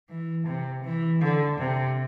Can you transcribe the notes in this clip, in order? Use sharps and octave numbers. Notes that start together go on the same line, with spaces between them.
E3
C3
E3
D3
C3